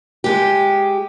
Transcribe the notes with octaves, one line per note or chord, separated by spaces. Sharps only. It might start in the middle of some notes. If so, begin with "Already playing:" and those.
G#3 G4